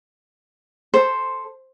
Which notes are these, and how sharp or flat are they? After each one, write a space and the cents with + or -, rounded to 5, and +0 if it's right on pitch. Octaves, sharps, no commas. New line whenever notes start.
A4 +0 C5 +0